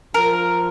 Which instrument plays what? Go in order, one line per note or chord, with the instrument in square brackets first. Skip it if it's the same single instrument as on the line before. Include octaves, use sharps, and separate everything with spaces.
[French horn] F3 [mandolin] A#4